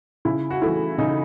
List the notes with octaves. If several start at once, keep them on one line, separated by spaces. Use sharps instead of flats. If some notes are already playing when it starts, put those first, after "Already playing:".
C#3 E4
F#4
E3 A3 E4
C#3 D#4